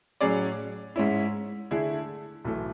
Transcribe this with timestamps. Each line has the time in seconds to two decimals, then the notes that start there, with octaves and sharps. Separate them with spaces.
0.21 A2 F#3 C#4 G#4 D5
0.96 G#2 G#3 C#4 E4
1.71 D3 A3 E4 G#4
2.45 B1 A2 E3 A3